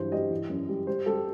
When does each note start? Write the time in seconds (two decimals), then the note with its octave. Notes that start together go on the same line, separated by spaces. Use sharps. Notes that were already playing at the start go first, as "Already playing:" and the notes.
Already playing: G2 E3 F#3 C5
0.12 G3 D#5
0.30 E3
0.50 F#2
0.69 G3
0.87 G3 C5
1.06 G3 A4